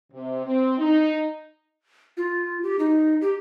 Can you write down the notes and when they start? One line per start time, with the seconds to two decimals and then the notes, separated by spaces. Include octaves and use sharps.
0.12 C3
0.45 C4
0.78 D#4
2.17 F4
2.63 G4
2.79 D#4
3.21 G4